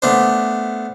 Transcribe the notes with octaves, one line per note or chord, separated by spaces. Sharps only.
A3 B3 D4 C5